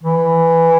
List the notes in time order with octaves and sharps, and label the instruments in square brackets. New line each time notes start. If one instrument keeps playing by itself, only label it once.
[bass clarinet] E3